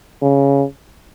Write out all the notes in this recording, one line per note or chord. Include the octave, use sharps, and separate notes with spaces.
C#3